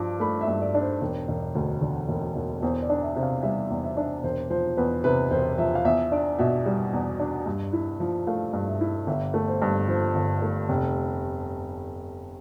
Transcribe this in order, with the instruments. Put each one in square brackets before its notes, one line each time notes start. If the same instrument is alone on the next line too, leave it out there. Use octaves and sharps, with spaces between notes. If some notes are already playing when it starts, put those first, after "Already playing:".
Already playing: [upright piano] G2 F3 D4 [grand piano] D6
[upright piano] A3 [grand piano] B5
[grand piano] E5
[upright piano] G2
[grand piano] D5
[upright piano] D4
[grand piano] C5
[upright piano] E1
E1
D2
D3
E1
E1
[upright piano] E2 [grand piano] C5
[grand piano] D5
[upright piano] D4
[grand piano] E5
[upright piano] C3
[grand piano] F5
[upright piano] G3 [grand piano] E5
[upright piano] E2
[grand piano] E5
[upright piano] D4
[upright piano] E1 [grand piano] C5
[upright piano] F3 [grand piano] C5
[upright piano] E2 [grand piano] B4
[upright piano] C3 [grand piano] B4
[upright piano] E1 [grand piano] C5
[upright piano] F3 [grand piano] E5
[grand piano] F5
[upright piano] E2 [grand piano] E5
[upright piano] D4 [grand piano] D5
[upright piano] B2 [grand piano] E5
[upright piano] G3
E2
D4
G2
E4
F3
[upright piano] A3 [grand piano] F5
[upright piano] G2
[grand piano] E5
[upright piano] E4
[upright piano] G1 [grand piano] E5
[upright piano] A3
[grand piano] C5
[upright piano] G2
[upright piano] F3 [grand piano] C5
[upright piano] G1
A3
F1